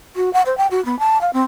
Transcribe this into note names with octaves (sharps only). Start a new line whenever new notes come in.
F#4
F#5
C5
G5
F#4
B3
A5
F5
C4